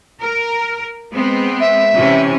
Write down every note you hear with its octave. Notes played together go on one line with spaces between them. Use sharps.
A#4
G#3 B3 C4
E5
C3 E3 C#4